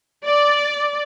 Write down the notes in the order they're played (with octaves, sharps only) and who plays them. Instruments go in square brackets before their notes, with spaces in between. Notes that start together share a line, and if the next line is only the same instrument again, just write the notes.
[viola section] D5